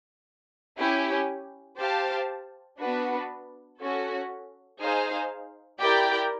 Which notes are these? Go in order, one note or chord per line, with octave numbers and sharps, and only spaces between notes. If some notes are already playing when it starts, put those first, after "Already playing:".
C#4 E4 G4
G4 C5 F5 A5
B3 D4 F#4 B4
C#4 F#4 A4
D#4 G#4 C5 F5
E4 G4 A#4 D5 G5